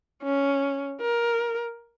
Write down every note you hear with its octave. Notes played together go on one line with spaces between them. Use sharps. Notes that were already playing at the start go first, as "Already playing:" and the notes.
C#4
A#4